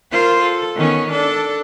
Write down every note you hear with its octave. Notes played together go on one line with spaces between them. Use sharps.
F4 A#4 C5
A4
D#3 B3 C#4
D4 A4